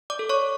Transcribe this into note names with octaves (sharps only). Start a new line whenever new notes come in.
D5 D6
A4
C#5 C#6